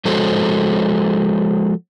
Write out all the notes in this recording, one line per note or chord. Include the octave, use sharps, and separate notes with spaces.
F3 G#3 F#4 A4 C5 C#5